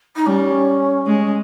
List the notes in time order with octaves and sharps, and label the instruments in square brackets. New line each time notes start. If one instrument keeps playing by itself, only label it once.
[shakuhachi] D#4
[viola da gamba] G3 [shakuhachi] C#4
[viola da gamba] G#3